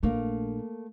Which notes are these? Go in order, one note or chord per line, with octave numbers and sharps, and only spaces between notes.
A#1 A3 A#3 D4